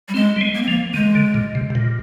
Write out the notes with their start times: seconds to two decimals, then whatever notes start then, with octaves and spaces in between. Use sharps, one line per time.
0.08 G3
0.14 G#3 C4
0.36 G3
0.41 G#3
0.55 A#3
0.62 C4
0.68 F3 A#3
0.94 D#3 G#3
1.15 D3
1.34 A#2
1.55 C3
1.70 C3
1.75 A#2